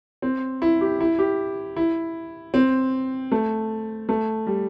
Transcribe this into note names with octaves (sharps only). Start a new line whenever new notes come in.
C4
E4
G4
E4
G4
E4
C4
A3
A3
G3